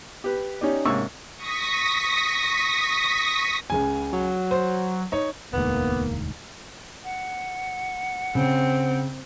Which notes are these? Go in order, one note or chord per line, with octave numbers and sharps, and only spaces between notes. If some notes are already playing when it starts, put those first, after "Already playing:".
G4 B4
C#4 D#4 G4 D5
G#2 C3 A#3 C#4 C#6 E6
C#6 D#6 A#6 B6
C#2 C#3 G#5
F#3
C5
D#4 C#5
E1 D2 G#2 A#3 B3
F#5
C#3 C4